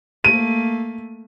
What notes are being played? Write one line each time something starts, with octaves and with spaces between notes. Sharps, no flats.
A3 A#3 D#7